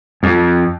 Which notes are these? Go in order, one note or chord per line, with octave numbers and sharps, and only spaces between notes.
F2